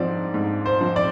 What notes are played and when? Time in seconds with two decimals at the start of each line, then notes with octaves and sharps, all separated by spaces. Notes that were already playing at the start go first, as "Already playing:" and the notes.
Already playing: G#2 F3 C4 D5
0.34 G#2
0.66 C5
0.81 F3 C4
0.96 D5